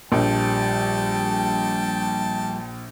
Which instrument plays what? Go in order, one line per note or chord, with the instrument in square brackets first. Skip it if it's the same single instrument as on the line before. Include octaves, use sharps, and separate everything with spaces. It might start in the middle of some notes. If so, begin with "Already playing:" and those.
[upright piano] A#1 [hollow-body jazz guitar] F3 G3 A#3 [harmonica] G5 A5